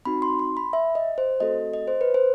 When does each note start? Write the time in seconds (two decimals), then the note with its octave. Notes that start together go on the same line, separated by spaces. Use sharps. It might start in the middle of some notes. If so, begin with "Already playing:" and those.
0.05 C4 D#4 F#4 B5
0.22 C6
0.39 C6
0.57 B5
0.73 E5
0.95 D#5
1.18 C5
1.40 A3 C4 F#4 A4 D#5
1.74 D#5
1.88 C5
2.01 B4
2.14 C5